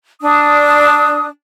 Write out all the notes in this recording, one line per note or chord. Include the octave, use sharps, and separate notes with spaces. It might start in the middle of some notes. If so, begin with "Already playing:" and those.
D4 D#6